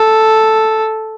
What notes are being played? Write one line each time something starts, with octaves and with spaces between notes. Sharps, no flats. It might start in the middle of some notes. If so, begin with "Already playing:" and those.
Already playing: A4